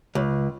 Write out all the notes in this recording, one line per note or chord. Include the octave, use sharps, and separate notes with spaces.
C#2